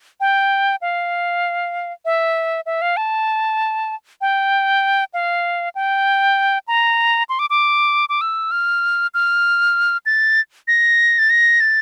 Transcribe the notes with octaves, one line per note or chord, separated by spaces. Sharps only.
G5
F5
E5
E5
F5
A5
G5
F5
G5
A#5
C6
D6
D6
D6
E6
F6
F6
A6
A#6
A6
A#6
A6